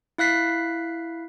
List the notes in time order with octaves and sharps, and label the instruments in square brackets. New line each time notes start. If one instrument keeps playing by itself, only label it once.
[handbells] E4 F5 F#6 B6 C7